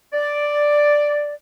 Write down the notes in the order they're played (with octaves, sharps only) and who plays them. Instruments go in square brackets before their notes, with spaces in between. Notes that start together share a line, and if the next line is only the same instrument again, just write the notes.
[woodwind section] D5